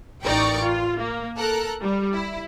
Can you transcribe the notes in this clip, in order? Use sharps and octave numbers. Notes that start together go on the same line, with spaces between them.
A1 D#4 A#4 D5 G5 C#6
F4
A#3
A4 A#4 A#5 F#6
G3
E4